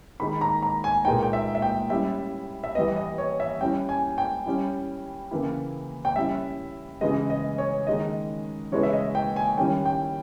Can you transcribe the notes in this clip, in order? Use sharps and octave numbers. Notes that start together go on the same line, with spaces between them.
D#3 G#3 D#4 B5
A#5
A#5
G#5
A#2 G#3 B3 D#4 G5
G5
E5
E5
G5
G3 C#4 E4 E5
E5
E3 G3 B3 D#5
D#5
C#5
E5
G3 C#4 E4 G5
G#5
G5
G3 C#4 E4
C#3 E3 A#3 E4
G5
G3 C#4 E4 E5
C#3 E3 G#3 D#5
D#5
C#5
D#3 G#3 D#4 D#5
C#3 E3 G#3 B3 E4 C#5
E5
D#5
G5
G#5
D#3 G3 C#4 E4 G5
G5